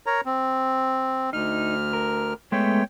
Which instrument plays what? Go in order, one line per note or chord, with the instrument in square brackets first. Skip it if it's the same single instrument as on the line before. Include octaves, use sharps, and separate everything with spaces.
[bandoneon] A#4 C#5 A#5
C4
[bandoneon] D2 F6 [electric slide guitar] D#4
[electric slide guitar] A#4
[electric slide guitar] G#3 A3 B3 [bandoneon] C#5 G5